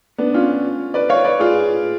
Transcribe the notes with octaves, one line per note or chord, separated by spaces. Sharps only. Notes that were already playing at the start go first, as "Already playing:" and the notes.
B3 D4
C#4 F4
B4 D5
C#5 F5
B4 D5
F4 G#4